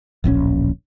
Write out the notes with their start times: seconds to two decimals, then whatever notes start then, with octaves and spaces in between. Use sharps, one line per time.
0.24 D1 A#1 A#2 C#4